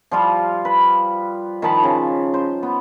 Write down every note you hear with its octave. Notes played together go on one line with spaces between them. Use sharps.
F3 G3 F4 F5
B4
D#3 F3 A5 B5
C#3
C5
B3